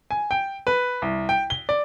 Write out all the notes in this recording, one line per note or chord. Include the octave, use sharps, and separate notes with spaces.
G#5
G5
B4
C2
G5
G7
D5